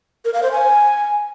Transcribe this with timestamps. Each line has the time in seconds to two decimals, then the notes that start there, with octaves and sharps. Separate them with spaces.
0.25 A#4
0.34 F5
0.43 C5
0.52 G#5